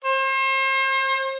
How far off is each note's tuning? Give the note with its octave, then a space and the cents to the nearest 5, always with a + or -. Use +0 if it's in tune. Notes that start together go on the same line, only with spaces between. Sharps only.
C5 +40